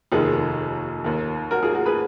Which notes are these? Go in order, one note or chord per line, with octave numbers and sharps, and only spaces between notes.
F1 D#2 D#3 F4 G#4
D#2 D#3
F#4 A#4
F4 G#4
F#4 A#4
G#4 B4